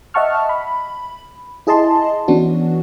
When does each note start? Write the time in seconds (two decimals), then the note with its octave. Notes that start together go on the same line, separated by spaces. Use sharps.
0.14 D#5 E5 F#5 A5 C#6 F6
0.49 B5
1.67 E4 G#4 D#5 A5 C6
2.28 E3 B3 C#4 D4 F#4